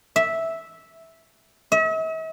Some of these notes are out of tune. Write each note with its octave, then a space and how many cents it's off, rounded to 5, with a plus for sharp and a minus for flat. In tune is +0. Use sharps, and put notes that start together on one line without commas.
E5 -5
E5 -45